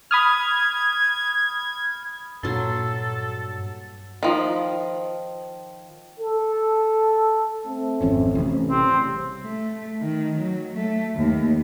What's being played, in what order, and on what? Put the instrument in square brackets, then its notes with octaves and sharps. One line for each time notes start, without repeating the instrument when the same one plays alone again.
[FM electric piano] B5 D#6 F6 [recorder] G#6
[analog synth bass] G2 [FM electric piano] A#2 A6 [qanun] F#3 C6 [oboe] A4
[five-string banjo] D#3 F3
[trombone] A4
[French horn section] A3 C4
[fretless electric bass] G#1 F2 C#4
A1 C3
[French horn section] C#3 G3 G4 [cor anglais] C4
[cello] A3
D#3
F#3
A3
D#2